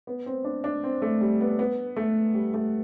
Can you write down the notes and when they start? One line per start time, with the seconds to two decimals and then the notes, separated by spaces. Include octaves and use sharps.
0.07 B3
0.26 C4
0.44 D4
0.64 D4
0.84 C4
1.02 A3
1.21 G3
1.41 B3
1.59 B3
1.96 A3
2.34 G3
2.54 A3